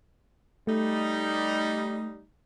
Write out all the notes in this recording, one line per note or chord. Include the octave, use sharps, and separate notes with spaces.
G3 A3 D#4